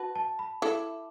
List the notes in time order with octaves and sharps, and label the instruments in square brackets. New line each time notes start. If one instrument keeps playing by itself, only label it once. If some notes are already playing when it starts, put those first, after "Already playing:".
Already playing: [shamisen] F#4 B4 [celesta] A5
[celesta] A5
B5
[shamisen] E4 A4 [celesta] D6